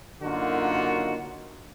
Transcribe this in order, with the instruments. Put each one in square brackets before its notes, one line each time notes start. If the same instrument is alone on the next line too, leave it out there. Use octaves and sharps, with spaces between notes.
[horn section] F#2 D3 A#3 D#4 F4 F#4